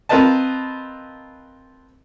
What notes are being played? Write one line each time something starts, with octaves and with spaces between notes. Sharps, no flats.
C4 F4 A#4 B4 D#5 A5